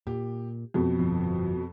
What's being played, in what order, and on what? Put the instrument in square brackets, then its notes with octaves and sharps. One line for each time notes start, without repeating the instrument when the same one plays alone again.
[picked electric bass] A#2 [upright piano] G4
[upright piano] F2 B2
[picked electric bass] G1 F3 C4